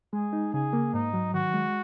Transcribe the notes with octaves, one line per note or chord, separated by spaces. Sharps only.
G#3 G#4
D#4
C#3 G#4
A#3
G#2 D#4
F#3
D#3 F#4
G#3